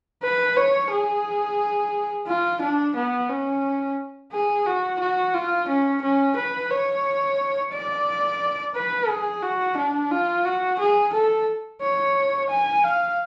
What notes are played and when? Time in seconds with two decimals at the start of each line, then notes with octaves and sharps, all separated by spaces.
0.23 B4
0.57 C#5
0.91 G#4
2.27 F4
2.61 D4
2.96 B3
3.29 C#4
4.32 G#4
4.66 F#4
5.00 F#4
5.34 F4
5.69 C#4
6.02 C#4
6.36 B4
6.70 C#5
7.73 D5
8.75 B4
9.08 G#4
9.43 F#4
9.77 D4
10.11 F4
10.45 F#4
10.79 G#4
11.14 A4
11.81 C#5
12.49 G#5
12.83 F5